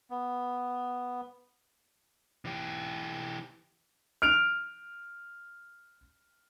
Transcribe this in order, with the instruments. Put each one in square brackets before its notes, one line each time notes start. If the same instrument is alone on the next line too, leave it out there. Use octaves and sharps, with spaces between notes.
[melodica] B3
[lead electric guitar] E3 G4
[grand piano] F6 D7 F7